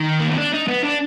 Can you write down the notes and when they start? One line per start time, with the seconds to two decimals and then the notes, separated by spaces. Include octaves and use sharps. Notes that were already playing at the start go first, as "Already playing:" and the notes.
Already playing: D#3
0.20 A#3
0.28 B3
0.38 D4
0.54 D#4
0.68 B3
0.84 D4